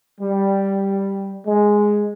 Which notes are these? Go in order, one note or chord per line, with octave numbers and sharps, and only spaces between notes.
G3
G#3